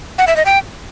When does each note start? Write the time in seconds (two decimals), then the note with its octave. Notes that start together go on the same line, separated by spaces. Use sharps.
0.18 F#5
0.27 E5
0.36 D#5
0.45 G5